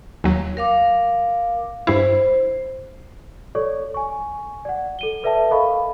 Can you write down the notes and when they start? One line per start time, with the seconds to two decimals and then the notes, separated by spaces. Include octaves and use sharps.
0.24 D#2 F#3
0.57 A#4 F5 D6
1.87 G2 E4 C5
3.55 A4 C#5 D5 C#6
3.94 G#5 C#6
4.65 D5 F#5
4.99 A4 D#7 G7
5.23 A4 B4 D5 E5 G5 A5
5.51 A4 A#4 D#5 F5 B5 C#6